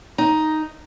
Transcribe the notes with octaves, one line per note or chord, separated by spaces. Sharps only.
D#4